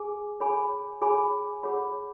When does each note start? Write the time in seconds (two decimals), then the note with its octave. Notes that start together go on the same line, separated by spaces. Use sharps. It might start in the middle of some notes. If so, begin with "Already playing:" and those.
Already playing: G#4 G#5
0.40 G#4 C#5 G#5 B5
1.01 G#4 C#5 G#5 B5
1.63 G#4 C#5 F#5 B5